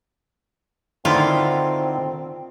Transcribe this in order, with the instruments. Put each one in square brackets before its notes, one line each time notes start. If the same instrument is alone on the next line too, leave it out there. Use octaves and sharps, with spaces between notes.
[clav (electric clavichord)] D3 D#3 E4 [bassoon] C4 [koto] F4